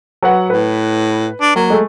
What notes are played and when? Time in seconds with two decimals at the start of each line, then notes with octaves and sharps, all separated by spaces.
0.23 F#3 B4 F#5
0.50 A2 B4
1.41 D4
1.56 F#3 A#3
1.70 G#3 A3